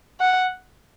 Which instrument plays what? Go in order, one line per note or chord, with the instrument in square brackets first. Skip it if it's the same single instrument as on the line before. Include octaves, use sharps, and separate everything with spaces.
[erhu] F#5